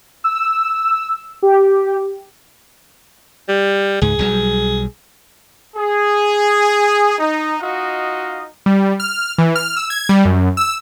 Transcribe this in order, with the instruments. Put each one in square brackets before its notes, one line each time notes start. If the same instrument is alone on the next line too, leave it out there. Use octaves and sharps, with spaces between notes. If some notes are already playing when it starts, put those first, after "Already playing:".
[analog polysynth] E6
G4
[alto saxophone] G3
[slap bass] C#2 G#2 [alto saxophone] G#4
[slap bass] B1 F#3 G3
[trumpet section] G#4
D#4
D#4 F4 F#4 D#5 F5
[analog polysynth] G3
F6
E3
F6
E6
G#6
G3
F#2
E6